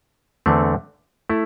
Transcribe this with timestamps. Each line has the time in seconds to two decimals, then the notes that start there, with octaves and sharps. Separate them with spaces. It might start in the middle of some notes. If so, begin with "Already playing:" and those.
0.46 E2 D3 A3 C4
1.30 A3 E4